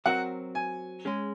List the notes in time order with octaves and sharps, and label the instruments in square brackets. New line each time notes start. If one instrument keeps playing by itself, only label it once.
[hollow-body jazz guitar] F#3 C4 F#4 A#4 [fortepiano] F#5
[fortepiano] G#5
[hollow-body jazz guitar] G#3 C#4 G#4